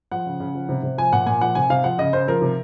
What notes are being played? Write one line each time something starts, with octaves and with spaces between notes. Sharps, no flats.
F3 F#5
C#3
C#3
F3
C3
C3
F3 G#5
A#2 F#5
A#2 G#5
F3 F#5
C3 G#5
C3 F5
F3 F#5
C#3 D#5
C#3 C5
F3 A#4
C3